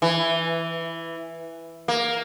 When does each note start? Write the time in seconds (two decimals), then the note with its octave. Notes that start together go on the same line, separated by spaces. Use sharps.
0.02 E3
1.88 A#3